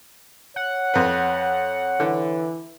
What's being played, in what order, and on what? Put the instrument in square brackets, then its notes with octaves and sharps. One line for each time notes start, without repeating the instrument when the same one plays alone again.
[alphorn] C#5 [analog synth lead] F#5
[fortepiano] F2 B4
[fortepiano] D3 [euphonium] E3